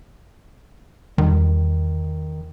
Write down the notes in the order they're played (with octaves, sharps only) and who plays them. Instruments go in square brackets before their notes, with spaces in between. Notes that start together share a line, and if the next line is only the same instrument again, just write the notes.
[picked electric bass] E2 G3 [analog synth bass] D#3